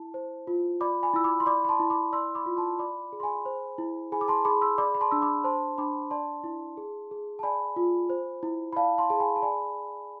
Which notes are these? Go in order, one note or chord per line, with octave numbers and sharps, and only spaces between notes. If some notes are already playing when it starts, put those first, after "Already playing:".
Already playing: E4 A5
C5
F4
D5 B5 D6
G#5 B5
E4 E6
B5 D6
C6
D5 B5 D6
B5
A5 C6
E4
B5 D6
D5 C6 E6
B5 D6
F4
A5 C6
D5 B5 D6
G#4
C6
G#5 B5
C5
E4
G#4 G#5 B5
D6
A5 C6
G#4 B5 D6
C6 E6
D5 B5 D6
B5
A5 C6
D4 E6
B5 D6
C5 A5 C6
D4 B5 D6
D5 A5 C6
E4
G#4
G#4
A5
D5 G#5 B5
F4
C5
E4
B5
D5 F5 A5
A5 C6
G#4 A5
G#5 B5
A5
D5 G#5 B5